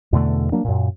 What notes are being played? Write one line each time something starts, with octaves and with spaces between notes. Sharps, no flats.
E2 B2 D3 A3
F#3 A#3 D4
F#2 A#2